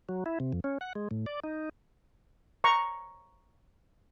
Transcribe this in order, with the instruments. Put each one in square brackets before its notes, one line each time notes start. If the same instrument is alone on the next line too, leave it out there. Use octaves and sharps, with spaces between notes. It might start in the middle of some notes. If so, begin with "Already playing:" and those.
[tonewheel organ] F#3
E4
C3
F2
C#4
F#5
G#3
A2
D5
D#4
[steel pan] A#5 C#6